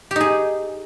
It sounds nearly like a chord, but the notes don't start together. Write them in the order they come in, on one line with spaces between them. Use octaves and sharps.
G4 D#4 G#4